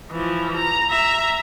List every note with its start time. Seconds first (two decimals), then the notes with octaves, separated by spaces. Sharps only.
0.11 E3 F3
0.56 A#5
0.90 E5 A#5